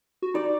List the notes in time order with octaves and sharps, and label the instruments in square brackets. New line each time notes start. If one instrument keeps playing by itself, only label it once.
[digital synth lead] F#4
[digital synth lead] D#4 [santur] D5